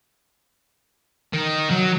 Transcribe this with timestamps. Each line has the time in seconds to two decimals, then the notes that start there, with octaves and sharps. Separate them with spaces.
1.34 D#3
1.71 F#3